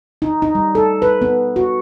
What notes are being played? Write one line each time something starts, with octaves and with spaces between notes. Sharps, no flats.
D#4
D#4
G3
A4
B4
B3
F#4